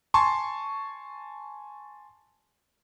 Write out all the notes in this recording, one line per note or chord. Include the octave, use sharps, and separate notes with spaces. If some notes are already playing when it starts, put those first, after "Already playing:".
G#5 A5 C6 C#6